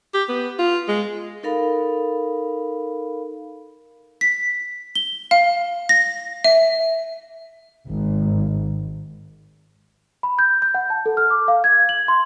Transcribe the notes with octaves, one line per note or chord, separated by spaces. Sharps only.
G4
B3
F4
G#3
D#4 A4 A#4 F5 B5
B6
G7
F5
A#6
E5
G#1
B5
G6
G6
F#5
A5
A4
F6
D6
F5
G#6
F#7
C6